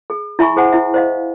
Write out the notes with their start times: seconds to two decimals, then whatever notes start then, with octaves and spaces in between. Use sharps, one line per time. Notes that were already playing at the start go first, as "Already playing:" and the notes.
0.10 G#4
0.39 E4 E5 G#5 B5 C#6
0.56 G#4 C5 F#5 G#5
0.72 E4 E5
0.94 C5 D#5 F5